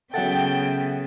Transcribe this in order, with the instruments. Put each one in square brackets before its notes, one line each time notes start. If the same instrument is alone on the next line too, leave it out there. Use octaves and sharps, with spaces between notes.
[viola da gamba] C#3 B3 [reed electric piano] F#3 A4 [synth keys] E5 F#5 A6 [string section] G5